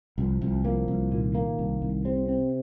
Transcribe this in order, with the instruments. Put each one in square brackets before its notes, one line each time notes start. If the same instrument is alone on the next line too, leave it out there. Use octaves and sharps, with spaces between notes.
[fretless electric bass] C2 [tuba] F3
[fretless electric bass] C2
[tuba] F3 [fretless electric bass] A#3
[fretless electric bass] C2
[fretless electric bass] A#2 [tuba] D#3
[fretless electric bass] A#3
C2
C2
[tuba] C3 [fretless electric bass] C4
[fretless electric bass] C4